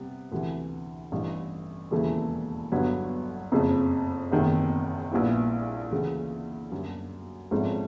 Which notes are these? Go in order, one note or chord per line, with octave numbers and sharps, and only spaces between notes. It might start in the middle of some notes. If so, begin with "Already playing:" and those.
Already playing: C3 G3 B3
D2 C3 E3
A1 G2 E3
E1 D#2 C#3 E3 A3
G1 G2 D3 F#3 B3
F#1 F2 C#3
F#1 E2 C3 D#3
A#1 A#2 G3 B3 E4
D2 C#3 E3
F#2 D3 G3
G#1 G#2 F3 A3 C#4